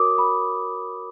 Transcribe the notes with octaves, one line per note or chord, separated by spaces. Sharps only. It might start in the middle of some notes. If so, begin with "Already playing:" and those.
Already playing: F#4 A#4 C#5 D6 D#6
B5